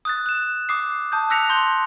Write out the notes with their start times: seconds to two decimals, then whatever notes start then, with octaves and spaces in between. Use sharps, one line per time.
0.05 D#6 F#6 A6
0.26 F#6 E7
0.69 D6 D#6 C7
1.12 A5 D#6 G6
1.30 E6 F#6 A#6 B6 C#7 F7
1.49 C6 G6 G7